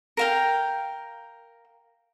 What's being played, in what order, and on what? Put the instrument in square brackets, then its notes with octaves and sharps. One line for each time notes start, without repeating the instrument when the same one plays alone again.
[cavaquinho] A#4 F5 G5